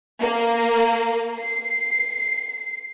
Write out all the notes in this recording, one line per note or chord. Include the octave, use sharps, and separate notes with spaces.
A#3
C7